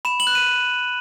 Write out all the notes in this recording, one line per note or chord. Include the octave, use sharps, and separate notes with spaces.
B5 E7
F#7
F#6
D#7